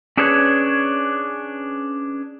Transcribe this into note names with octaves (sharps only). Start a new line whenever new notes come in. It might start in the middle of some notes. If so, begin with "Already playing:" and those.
C#4 D4 G#4 B4 C#5